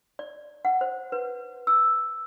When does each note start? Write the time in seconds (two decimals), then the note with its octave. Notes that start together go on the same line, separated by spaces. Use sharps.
0.19 D5
0.65 F#5
0.81 C5
1.12 B4
1.67 E6